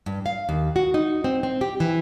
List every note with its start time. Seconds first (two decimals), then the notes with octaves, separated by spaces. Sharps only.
0.06 G2
0.26 F5
0.49 D#2
0.76 F#4
0.94 D#4
1.24 C4
1.43 C4
1.61 G4
1.80 E3